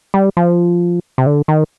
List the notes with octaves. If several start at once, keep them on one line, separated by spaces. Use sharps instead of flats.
G3
F3
C3
D3
D#3